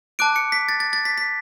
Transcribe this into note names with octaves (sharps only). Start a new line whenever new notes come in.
A5 D6 F#6 D7
C#7
B6
A6
A6
A6
B6
B6